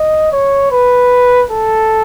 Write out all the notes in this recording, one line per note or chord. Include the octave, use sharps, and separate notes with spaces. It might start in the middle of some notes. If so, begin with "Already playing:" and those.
Already playing: D#5
C#5
B4
A4